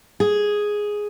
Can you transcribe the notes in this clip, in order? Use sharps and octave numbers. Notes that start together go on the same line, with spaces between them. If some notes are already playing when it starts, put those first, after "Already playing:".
G#4